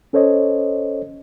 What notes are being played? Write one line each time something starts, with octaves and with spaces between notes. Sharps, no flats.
C#4 A4 C5 C#5 D#5